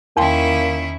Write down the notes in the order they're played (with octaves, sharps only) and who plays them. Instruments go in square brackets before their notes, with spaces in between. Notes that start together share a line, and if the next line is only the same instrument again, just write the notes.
[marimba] E2 G5 C6 [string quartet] D#3 C#4 E4 [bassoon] A#3